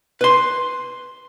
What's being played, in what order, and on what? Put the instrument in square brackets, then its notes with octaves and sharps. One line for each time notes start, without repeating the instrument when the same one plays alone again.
[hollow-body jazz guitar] B4 C6